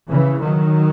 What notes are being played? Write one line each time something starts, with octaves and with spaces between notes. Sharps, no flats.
C#3 E3
D#3 F#3